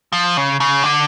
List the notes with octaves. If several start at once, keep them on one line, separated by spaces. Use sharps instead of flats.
F3
C#3
C#3
D3